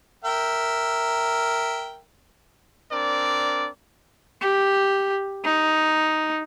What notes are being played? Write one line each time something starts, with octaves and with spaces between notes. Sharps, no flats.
A#4 E5 G5
C4 D4 A#4 D5
G4
D#4